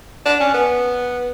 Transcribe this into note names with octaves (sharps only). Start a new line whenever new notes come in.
D4
C#4
B3